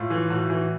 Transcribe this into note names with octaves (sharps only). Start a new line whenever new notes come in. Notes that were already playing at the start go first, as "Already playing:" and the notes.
Already playing: A2 F4
E3
A2 F#4
E3